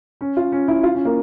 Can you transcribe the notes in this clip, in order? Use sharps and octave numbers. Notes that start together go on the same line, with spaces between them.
C#4
F4
C#4
E4
F4
C#4
A#3